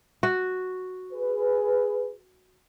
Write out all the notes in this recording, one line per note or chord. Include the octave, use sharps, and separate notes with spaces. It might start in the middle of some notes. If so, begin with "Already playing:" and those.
F#4
G#4 B4